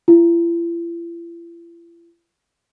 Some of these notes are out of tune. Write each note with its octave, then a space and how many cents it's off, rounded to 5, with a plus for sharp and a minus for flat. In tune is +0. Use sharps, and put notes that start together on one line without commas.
E4 +45